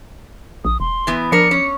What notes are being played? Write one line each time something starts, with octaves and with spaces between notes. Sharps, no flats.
A#1 D#6
E1 C6
E3 B3
F3 D4 A#4 C#7
C#4 C#5